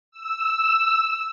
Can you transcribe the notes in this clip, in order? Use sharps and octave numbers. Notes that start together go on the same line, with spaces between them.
E6